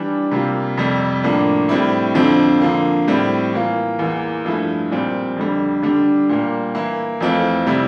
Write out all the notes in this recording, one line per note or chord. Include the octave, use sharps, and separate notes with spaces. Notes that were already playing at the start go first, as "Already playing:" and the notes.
Already playing: E3 G3 D4
C3 G3 A#3 F4
F2 C3 G3
A2 F3 A#3 D4
A2 G3 C4 E4
F2 D3 F3 C4
D3 F3 A#3
A2 G3 C4 E4
E3 A#3 F4
E2 E3 A#3
G2 F3 A3 E4
A#2 G3 C4
F2 D3 G3
D3 G3 D4
A#2 G3 A#3
E3 A#3 E4
F2 E3 A3 C4 F4
C3 G3 C4 E4